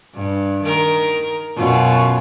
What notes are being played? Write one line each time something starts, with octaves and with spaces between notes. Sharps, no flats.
G2
D#3 A#4
F#2 B2 F4